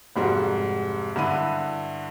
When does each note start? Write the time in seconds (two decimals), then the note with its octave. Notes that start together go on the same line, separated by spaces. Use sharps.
0.16 F1 G#2 G3 F#4
1.16 G2 D3 E4 D#7